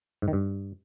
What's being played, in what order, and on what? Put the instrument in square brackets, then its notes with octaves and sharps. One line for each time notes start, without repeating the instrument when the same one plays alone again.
[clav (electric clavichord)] G#2
D#3
G2